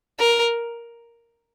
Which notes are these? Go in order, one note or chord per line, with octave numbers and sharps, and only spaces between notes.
A#4